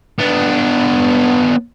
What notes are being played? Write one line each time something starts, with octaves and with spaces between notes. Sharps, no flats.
B3 D4